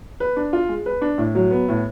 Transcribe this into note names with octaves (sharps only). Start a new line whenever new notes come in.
B4
D4
F4
G#3
B4
D4
A2
F#3
B3
A2